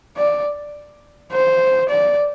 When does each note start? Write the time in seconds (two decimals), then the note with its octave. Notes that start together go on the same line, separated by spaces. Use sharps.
0.17 D5
1.32 C5
1.89 D5